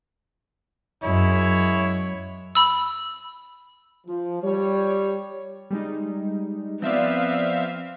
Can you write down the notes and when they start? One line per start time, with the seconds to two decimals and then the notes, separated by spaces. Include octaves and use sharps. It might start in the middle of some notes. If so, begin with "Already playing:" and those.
1.04 F#2 G#3 E4 C#5
2.55 B5 E6
4.06 F3
4.42 G3 C#5
5.71 G3 G#3 D#4
6.82 F3 B3 C4 D5 E5 F5